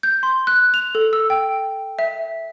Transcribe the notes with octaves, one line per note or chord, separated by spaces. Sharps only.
G6
C6
F#6
F7
A4
E6
G5
E5